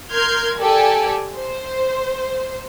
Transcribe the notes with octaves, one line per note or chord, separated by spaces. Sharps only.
A#4 C6 F6 G6 G#6
G4 A4 D5 G#5
C5